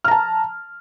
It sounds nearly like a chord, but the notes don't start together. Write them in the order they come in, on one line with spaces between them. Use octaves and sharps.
F6 A#5 A5